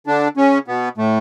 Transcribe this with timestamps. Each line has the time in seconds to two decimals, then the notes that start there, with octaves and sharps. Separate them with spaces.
0.07 D3 D4
0.37 C#3 C#4
0.68 B2 B3
0.97 A2 A3